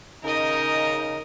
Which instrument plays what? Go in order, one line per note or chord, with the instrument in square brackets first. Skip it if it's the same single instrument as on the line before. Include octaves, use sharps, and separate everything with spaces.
[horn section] C#3 D#4 [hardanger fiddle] A#4 D#5